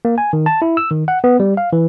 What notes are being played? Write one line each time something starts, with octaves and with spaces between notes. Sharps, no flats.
A#3
G#5
D#3
A5
E4
E6
D#3
F#5
B3
G3
F5
E3